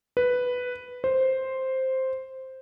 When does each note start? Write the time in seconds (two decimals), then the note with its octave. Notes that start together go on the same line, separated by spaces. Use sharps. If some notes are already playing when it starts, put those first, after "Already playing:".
0.17 B4
1.04 C5